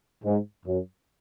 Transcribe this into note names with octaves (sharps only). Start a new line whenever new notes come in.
G#2
F#2